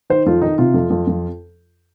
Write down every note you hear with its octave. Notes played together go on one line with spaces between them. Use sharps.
D#3 C5
F2 F4
D#3 D#4
C3 F4
F2
F2
F2